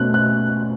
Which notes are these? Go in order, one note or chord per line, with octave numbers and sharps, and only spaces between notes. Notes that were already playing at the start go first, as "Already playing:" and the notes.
Already playing: B2 A3 C#4 F#6
F#6